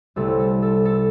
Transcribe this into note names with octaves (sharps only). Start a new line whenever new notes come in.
C2 C3 A3 A4
A4
A4
A4